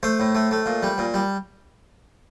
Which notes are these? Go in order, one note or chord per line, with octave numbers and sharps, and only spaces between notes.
A3 C5
A2
A3
A3
A#2
G3
A#2
G3